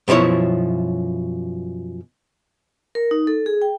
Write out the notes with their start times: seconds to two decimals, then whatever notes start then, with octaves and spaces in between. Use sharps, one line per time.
0.08 F#2 B2 F3 E4 C#5
2.95 A#4
3.11 D#4
3.27 A4
3.46 G#4
3.62 G5